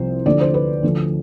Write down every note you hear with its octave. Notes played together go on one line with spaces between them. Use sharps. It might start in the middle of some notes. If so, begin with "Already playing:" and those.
Already playing: C2 C3 F3 C5
D2 D3 F3 D5
C5
B4
D2 D3 F3